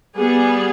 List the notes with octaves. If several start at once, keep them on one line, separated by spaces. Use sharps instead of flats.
G3 B3 G#4